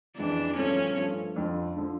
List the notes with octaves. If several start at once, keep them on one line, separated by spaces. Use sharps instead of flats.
F2 C#3 E3 D4
G2 F3 A3 C#4
G2 F3 A3
F2 D3 F3
D3 F3